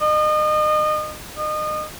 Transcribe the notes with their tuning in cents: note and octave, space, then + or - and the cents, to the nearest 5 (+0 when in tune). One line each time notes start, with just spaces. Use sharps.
D#5 -30
D#5 -30